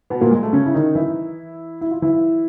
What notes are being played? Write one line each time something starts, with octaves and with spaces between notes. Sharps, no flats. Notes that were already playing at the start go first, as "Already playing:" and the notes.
B2 B3
A#2 A#3
G#3
A3
C#3 C#4
E4
D#3 D#4
E3 E4
E4
F4
E3 E4